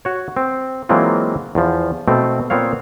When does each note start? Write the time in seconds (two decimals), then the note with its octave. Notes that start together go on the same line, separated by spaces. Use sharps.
0.05 F#4 C#5
0.37 C4
0.89 E3 F#3 G#3 A#3 C4 F4
1.55 E2 F3
2.08 B2 A3 C4
2.50 A#2 B3 C4 C#5 F5